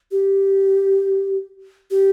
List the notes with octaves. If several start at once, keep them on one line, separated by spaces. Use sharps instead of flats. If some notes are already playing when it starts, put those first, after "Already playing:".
G4
G4